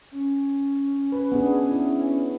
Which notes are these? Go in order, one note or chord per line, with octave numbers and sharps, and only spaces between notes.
C#4
B4
B3 D4 G#4
E4